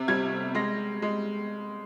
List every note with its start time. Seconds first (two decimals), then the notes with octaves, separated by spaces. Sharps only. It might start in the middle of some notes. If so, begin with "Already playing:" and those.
Already playing: C3
0.08 G3 G#6
0.55 G#3 A#6
1.02 G#3